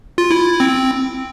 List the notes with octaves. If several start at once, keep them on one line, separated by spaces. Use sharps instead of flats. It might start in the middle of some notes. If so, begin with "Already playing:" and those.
F4
E4
C4